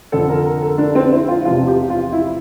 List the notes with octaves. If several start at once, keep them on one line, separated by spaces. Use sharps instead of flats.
F2 D3 F3 A4
A#4
A#4
A4
D4
C4
E4
F4
E2 C3 F3 F4
G4
F4
E4